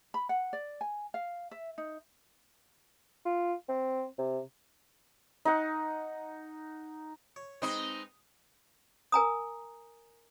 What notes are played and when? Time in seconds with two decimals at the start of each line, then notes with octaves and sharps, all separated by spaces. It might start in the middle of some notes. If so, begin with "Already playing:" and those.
0.14 B5
0.29 F#5
0.53 D5
0.81 G#5
1.14 F5
1.51 E5
1.78 D#4
3.26 F4
3.69 C4
4.19 C3
5.45 D#4 F#5
7.36 C#5
7.62 G#3 C4 D#4 G#4 B4
9.12 A#4 G#5 A#5 D#6